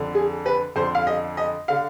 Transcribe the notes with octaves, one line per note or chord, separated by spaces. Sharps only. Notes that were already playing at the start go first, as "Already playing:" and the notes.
Already playing: F2 D3
G#4
B4
F2 D3 C5
F5
D#5
D#5
D3 F5